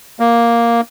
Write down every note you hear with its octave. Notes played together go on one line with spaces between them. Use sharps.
A#3